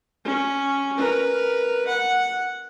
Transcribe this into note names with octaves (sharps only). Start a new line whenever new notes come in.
C#4
A#4 B4
F#5